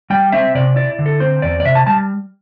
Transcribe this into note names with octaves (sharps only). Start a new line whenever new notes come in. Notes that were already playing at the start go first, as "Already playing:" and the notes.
G3 G5
C4 E5
C3 D5
E4 D5
D3
A4
C4 C5
E2 D5
D5
C3 E5
A5
G3 A5